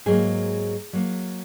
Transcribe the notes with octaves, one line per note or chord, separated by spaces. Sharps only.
G#2 F#3 A#3 G#4
F#3 A#3